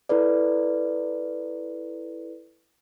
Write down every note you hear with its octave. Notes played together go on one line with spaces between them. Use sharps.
E4 A4 B4 D5